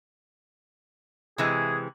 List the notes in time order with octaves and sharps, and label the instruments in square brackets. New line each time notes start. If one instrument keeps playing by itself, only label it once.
[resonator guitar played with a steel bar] C3 E3 G#3 [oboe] G#4